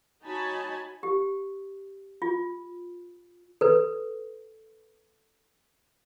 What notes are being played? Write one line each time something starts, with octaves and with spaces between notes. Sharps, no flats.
D#4 F#4 C#5 G#5 A5 B5
G4
F4
A4 B4